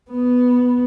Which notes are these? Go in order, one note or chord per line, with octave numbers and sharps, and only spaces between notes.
B3